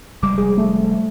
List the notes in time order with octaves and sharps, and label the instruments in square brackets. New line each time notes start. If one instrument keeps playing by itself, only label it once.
[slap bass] F1 G3 G#3 [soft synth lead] D6
[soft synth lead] G#4
A3